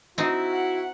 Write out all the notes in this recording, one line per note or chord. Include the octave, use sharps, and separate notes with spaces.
C4 D#4 E4 F#4
F#5